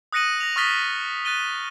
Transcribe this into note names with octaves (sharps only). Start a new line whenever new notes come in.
D#6 F#6 A#6 C#7 D#7 F#7
A#6 F7
C#6 D#6 F6 A6 B6 G7
F#6 A6 D#7 G7